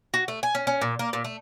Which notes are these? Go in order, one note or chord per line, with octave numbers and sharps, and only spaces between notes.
F#4
A3
G#5
C#4
C#4
A#2
A#3
A#2
A3